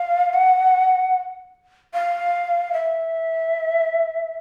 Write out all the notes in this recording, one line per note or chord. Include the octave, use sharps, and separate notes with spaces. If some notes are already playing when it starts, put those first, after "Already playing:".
Already playing: F5
F#5
F5
E5